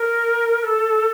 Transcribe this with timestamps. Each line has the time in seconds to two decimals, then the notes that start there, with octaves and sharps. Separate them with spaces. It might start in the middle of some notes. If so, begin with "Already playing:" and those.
Already playing: A#4
0.63 A4